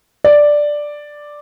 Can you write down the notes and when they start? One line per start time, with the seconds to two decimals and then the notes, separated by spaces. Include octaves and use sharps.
0.24 D5